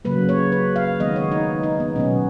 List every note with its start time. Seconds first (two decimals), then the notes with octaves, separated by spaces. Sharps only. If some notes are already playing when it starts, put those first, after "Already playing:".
0.05 C#3 F#3 A#3 B4
0.29 C#5
0.52 B4
0.76 F5
1.00 D#3 G#3 B3 D#5
1.16 C#5
1.32 D#4
1.63 D#4
1.80 B3
1.96 B2 F#3 B3 C#4